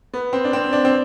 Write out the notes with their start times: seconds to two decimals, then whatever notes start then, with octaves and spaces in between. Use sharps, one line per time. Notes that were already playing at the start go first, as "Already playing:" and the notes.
0.14 B3
0.33 C4
0.44 D4
0.53 C4
0.73 D4
0.85 C4